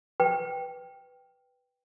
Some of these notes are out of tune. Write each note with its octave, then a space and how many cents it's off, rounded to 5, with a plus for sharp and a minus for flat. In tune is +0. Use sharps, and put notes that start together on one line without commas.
B4 +0 G5 +0